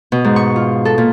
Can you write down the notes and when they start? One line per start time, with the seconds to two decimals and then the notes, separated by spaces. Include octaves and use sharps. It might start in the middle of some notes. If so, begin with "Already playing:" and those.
0.12 B2
0.24 G#2
0.36 C#6
0.56 F4
0.85 A4
0.98 A#2